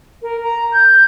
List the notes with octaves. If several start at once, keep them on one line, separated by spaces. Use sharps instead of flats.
A#4
A#5
G6